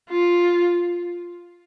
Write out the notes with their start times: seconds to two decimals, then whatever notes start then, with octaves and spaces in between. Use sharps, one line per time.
0.10 F4